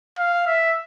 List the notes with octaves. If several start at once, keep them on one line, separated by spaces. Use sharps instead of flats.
F5
E5